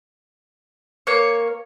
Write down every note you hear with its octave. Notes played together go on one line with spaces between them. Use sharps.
A#3 C#5